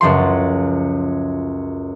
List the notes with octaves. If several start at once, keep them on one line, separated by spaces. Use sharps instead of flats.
C#2 F#2 F3 C6